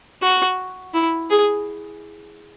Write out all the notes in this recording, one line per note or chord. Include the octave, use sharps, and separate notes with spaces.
F#4
E4
G#4